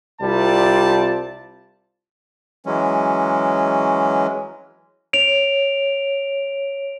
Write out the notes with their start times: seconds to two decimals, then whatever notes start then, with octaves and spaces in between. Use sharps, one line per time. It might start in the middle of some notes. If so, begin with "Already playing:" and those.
0.21 C2 C3 G3 F4 D5 A5
2.66 E3 F#3 G#3 C#4
5.13 C#5 D7 F7